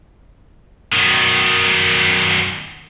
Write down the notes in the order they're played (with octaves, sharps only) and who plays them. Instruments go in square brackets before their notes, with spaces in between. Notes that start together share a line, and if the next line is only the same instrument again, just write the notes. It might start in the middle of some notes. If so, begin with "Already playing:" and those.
[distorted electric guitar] F#2 D#3